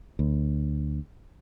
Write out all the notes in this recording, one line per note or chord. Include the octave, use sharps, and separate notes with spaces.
D2